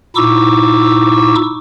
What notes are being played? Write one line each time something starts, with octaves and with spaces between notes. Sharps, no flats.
A#2 D#4 E4 C#6 D6 E6